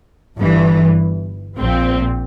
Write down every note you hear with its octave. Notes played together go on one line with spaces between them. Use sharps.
G1 G2 E3
A#1 A#2 C4